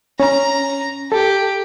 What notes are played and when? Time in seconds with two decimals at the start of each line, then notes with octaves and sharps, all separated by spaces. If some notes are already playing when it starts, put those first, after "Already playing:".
0.20 C#4 A#5
1.12 G4 A4